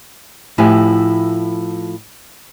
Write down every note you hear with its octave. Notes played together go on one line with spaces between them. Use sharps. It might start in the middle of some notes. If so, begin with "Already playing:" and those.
A2 F3 E4 G4 B4 G#5